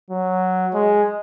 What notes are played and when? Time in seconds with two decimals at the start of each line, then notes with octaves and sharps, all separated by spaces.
0.10 F#3
0.74 G#3